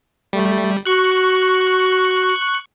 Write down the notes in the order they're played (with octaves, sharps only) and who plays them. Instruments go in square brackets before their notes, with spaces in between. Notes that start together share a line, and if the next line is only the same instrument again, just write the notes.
[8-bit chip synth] G3 [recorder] A3
[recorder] F#4 [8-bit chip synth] C#6 F#6